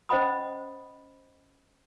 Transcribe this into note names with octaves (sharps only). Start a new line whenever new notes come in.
C#4 C5 D#5 F#5 B5 D#6